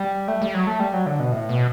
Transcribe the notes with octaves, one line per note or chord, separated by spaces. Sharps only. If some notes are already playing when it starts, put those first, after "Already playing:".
Already playing: G3
A3
G3
F#3
A3
G3
F#3
D3
B2
A2
B2